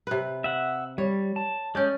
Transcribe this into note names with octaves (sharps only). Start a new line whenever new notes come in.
C3 B4
E5 F#5
G3 C#5
A5
G#3 C#4 D5 G6